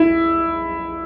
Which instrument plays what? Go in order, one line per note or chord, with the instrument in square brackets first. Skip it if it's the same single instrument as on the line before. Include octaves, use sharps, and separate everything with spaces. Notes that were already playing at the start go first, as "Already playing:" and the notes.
Already playing: [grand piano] E4